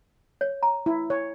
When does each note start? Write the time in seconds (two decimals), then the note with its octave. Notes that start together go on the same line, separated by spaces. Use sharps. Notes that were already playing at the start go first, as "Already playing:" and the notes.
0.41 C#5
0.63 A#5
0.86 E4
1.10 C#5